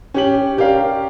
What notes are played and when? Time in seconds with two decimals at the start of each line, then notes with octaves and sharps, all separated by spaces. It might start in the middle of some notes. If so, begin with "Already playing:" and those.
0.14 C#4 G4 F#7
0.57 C#4 G4 A#4 D5 F5